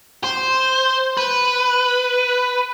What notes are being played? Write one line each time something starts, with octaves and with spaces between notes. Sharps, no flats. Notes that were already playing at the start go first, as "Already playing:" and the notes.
C5
B4